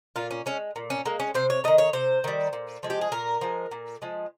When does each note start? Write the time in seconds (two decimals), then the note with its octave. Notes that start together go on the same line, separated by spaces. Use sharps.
0.16 A#2 F4
0.31 C#4
0.46 G#3 C#4
0.76 A#2
0.90 C#4
1.06 G#3 A#3
1.20 C#4
1.34 C3 C5
1.50 C#5
1.64 D#3 G3 D#5
1.78 C#5
1.93 C3 C5
2.24 D#3 G3
2.53 A#2
2.83 F3 G#3
2.90 G4
3.01 G#4
3.12 A#2 A#4
3.41 F3 G#3
3.71 A#2
4.02 F3 G#3